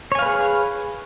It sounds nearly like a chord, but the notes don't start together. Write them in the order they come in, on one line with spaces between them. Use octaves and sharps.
C#5 G#5 F5 B4 G#4